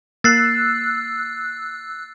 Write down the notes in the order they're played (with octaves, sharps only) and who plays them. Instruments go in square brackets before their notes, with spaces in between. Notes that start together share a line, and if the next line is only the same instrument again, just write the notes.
[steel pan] A#3 [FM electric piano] E6 F#6 [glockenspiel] A6 C7